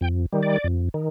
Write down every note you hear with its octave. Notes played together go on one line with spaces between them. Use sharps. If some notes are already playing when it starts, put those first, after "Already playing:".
F2 G5
D#3 G3
D5
F2
D#3